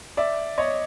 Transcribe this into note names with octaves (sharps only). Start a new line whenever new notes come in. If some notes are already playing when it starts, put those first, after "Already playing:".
D5 E5
C#5 D#5